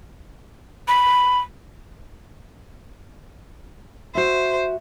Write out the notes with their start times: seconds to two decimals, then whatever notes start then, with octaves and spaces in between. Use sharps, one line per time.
0.88 B5
4.15 F#4 C5 E5